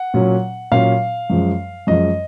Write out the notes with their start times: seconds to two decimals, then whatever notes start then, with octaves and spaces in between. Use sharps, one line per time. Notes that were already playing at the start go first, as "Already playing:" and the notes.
Already playing: F#5
0.14 A#2 F#3 C#4
0.72 A#2 F#3 C#4 F5
1.30 F#2 F3 G#3
1.87 F#2 F3 G#3 D#5